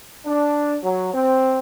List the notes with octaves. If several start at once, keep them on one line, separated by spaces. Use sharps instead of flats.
D4
F#3
C4